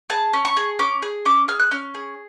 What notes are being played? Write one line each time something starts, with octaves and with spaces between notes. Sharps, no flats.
G#4 A5
C#4
C#6
G#4
C#4 D6
G#4
C#4 D6
G#4 F6
F#6
C#4 F6
G#4